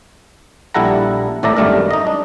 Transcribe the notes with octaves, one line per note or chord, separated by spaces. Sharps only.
A#1 G3 E4 A4 F#5 A#5
G#1 A2 A3 D5 E5 A#5
G#1 F#2 G3 A3 D4 A#4
D#4 D#5
D4